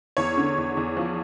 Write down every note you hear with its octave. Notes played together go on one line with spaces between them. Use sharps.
E2 C#5
D3
E2
E2
F3